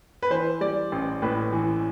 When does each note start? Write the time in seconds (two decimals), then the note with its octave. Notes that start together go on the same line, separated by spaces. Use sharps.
0.22 B4
0.30 E3 C5
0.61 G3 D5
0.92 A1
1.22 A2 B4
1.52 E3